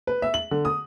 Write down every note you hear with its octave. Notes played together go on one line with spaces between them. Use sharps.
B4
E5
F#7
D3
D#6